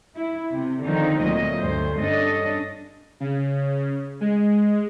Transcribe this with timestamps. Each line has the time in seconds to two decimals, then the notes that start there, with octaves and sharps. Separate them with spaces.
0.15 E4
0.52 C3
0.83 D3 D#3 F3 C4 D#4
1.22 D2 A#2 F#3 D#5
1.60 D2 G2 C5
1.96 G2 C#4 D4 A4 D#5
3.20 C#3
4.21 G#3